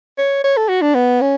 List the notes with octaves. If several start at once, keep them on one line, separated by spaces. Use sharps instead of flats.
C#5
C#5
A4
F#4
D4
B3
C#4